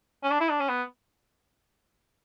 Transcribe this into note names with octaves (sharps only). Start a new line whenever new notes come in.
C#4
D4
E4
D4
C#4
B3